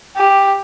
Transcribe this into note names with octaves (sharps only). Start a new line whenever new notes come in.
G4